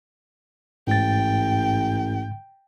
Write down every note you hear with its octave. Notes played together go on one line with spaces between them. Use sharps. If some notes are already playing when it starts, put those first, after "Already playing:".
A1 G#2 G5 A6